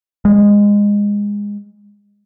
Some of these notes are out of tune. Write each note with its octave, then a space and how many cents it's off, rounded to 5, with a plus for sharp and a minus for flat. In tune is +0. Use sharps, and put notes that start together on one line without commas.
G#3 -20